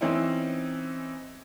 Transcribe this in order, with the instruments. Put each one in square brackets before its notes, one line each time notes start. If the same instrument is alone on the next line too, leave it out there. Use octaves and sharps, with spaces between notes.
[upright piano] E3 C4 C#4 D#4 E4